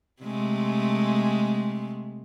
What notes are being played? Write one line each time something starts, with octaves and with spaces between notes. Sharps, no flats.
C3 G#3 A3